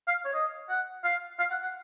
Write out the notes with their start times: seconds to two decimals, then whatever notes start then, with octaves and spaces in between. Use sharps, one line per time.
0.07 F5
0.25 C#5
0.33 D#5
0.69 F#5
1.04 F5
1.39 F5
1.50 F#5
1.62 F#5